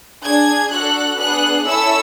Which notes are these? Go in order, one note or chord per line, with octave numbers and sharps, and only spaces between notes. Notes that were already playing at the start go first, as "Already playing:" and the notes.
D4 G#4 G#6
D4 F#4 A4 F#6
B3 D4 G#4 F#6
C#4 E4 A4 E6